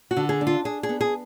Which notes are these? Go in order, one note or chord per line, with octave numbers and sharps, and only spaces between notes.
F#4
D3
G#4
D4
F4
D4 G#4
G#4
B3
G#4